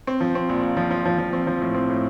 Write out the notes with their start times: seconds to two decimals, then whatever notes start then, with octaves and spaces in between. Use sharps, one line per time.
0.07 C4
0.21 F3
0.35 C4
0.49 A#1
0.63 A#1
0.77 F3
0.91 F3
1.05 F3
1.18 F3
1.33 C4
1.47 F3
1.61 A2
1.75 C4
1.89 A2